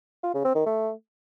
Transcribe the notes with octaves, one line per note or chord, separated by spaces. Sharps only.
F4
C#3
C4
D#3
A3